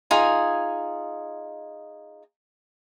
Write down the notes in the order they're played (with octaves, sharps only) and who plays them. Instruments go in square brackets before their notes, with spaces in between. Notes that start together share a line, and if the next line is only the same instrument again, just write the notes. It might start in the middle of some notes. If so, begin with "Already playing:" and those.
[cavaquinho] D#4 F4 G#4 G#5